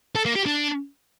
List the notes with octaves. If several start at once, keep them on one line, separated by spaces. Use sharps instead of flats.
A4
A#3
G4
D4